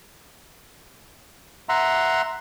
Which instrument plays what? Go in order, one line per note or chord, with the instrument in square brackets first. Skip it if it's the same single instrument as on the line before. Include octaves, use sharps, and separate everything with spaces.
[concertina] E5 F#5 A#5 C6